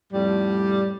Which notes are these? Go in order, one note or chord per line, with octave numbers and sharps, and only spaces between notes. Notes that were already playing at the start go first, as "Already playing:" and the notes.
F2 A2 G3